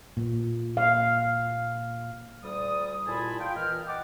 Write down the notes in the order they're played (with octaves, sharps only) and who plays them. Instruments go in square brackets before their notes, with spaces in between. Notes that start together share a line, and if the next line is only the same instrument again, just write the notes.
[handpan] A#2
F5
[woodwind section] D2 G3 D5 D#6
D#2 A#2 E4 G#4 A5 B5
F4 G5
A#2 E3 D#5 F6
D#5 F#5 G5 A5 D6